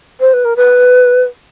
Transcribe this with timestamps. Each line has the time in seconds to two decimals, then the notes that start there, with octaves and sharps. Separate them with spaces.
0.20 C5
0.33 B4
0.45 A#4
0.56 B4